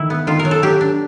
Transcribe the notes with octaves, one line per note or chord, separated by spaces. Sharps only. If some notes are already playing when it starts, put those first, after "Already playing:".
Already playing: D#3 E3 E4
B3
D#3 F4
A#4
F#3
A4
F#3 G4
D4